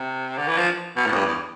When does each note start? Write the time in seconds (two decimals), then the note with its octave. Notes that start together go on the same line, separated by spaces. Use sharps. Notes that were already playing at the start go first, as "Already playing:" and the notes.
Already playing: C3
0.38 D3
0.47 E3
0.57 F3
0.96 B2
1.06 A2
1.12 F2
1.16 G2
1.26 E2